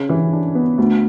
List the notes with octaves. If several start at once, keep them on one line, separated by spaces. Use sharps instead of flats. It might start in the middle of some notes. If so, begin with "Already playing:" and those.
Already playing: C#3 C#4
E3
D4
B3
D2